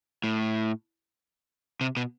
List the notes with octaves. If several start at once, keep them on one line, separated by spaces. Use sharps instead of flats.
A2
C3
B2